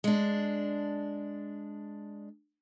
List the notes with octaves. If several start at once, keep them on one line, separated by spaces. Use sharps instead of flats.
G#3 D4